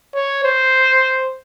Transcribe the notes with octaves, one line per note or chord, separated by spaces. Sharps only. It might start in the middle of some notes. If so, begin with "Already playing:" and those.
C#5
C5